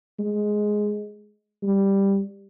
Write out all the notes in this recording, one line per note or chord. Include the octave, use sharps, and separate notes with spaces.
G#3
G3